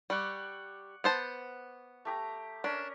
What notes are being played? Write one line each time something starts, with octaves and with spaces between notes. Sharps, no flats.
G3 F#5 C#6 D6
B3 C5 A5
A3 G4 A#5
C#4 D4 A#4